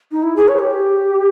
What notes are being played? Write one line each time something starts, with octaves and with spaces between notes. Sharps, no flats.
D#4
E4
G#4
C#5
G4